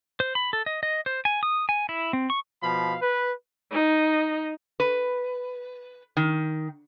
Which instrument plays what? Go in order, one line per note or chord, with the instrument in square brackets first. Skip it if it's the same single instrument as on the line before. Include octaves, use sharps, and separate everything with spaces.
[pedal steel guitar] C5
B5
A4
D#5
D#5
C5
G#5
D#6
G#5
E4
C4
C#6
[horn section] B2 F3 F5 B5
B4
[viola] D#4
[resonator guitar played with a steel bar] B4
D#3